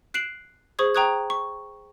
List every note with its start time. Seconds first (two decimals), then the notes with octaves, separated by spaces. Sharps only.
0.14 F#6 C7 D7 E7 F#7
0.79 G#4 C5 C#6 D#6 G#6
0.95 G5 A#5 C#6 D#6 F#6 G#6
1.30 C#6